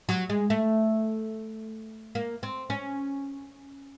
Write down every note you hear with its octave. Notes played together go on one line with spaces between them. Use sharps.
F#3
G#3
A3
A#3
C4
C#4